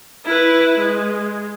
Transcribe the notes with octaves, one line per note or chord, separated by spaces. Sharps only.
E4 B4
G#3